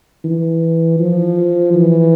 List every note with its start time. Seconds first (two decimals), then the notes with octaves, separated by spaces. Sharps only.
0.24 E3
0.99 F3
1.74 E3